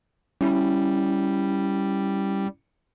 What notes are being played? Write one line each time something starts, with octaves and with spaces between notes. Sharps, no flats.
G3 C#4 E4